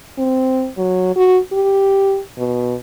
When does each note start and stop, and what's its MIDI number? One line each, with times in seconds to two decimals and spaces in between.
0.18 0.68 60
0.78 1.13 54
1.16 1.38 66
1.52 2.20 67
2.38 2.75 47